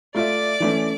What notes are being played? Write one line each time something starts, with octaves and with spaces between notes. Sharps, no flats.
A3 F4 D5 E5 D6
E3 A3 C#4